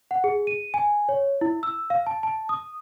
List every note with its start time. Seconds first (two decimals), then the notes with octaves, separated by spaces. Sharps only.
0.11 F#5
0.24 G#4
0.47 D#7
0.74 G#5
1.09 C#5
1.41 E4
1.63 E6
1.90 F5
2.07 A5
2.23 A5
2.49 D#6